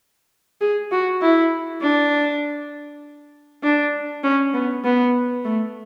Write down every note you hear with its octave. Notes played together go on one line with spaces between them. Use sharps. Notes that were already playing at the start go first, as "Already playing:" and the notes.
G#4
F#4
E4
D4
D4
C#4
B3
B3
A3